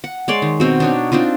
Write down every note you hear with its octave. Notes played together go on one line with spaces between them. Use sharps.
F#5
G#3 C#5 D5 C6
D#3
B2 C4 F#4
D4 D#4 C#5
C4 D4 D#4 F4